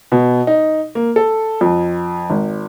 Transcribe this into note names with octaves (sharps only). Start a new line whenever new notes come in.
B2
D#4
A#3
A4
F2
G#1